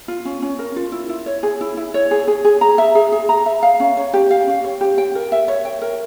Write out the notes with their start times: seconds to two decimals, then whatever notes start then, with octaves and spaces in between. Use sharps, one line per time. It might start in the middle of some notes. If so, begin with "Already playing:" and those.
0.08 F4
0.25 C#4
0.42 C#4
0.59 A#4
0.76 F4
0.92 E4
1.09 E4
1.26 C#5
1.43 G#4
1.61 E4
1.77 E4
1.94 C#5
2.11 G#4
2.28 G#4
2.45 G#4
2.61 A#5
2.78 E5
2.95 G#4
3.12 G#4
3.29 A#5
3.46 E5
3.63 F5
3.80 C#4
3.97 C#5
4.13 G4
4.31 F5
4.47 C#4
4.64 C#5
4.81 G4
4.98 G5
5.15 A#4
5.32 E5
5.48 C#5
5.65 G5
5.82 A#4